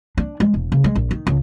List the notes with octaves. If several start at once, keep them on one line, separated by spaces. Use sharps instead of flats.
D4
G#3
E1
C#3
G#3
A#1
D#3
C#2